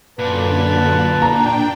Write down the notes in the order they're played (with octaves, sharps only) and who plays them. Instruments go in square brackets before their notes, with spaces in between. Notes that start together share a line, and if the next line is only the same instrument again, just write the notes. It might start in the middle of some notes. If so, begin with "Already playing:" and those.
[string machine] F#2 D3 [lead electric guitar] A#2 [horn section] B4 A5
[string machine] D4 G5 [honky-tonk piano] A#5